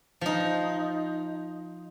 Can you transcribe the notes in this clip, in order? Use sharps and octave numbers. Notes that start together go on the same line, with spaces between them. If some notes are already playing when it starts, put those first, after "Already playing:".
F3 D#4